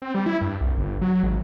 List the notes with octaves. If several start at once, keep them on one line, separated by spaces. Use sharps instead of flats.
C4
G3
E4
G2
C2
G1
F#3
G#1